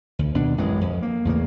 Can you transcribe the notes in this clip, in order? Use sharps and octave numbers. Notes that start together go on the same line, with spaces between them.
D2
D#2 B2 D4
A1 F#2 E3 G#3
F2
A#3
E2 A2 C#3 A#3